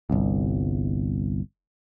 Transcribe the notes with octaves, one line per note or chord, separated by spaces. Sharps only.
G1 C2